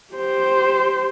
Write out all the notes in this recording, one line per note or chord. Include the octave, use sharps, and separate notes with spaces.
G4 C5